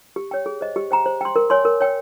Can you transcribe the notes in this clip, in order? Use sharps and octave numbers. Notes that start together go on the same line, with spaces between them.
G4
C#5 G5
G#4
C5 D#5
G4
C5 G5 A#5
C5
G5 C6
A#4
C#5 G#5 C6
A#4
C#5 G5